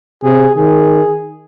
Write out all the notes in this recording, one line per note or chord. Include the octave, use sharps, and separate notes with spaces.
C3 G#4
D#3 G#4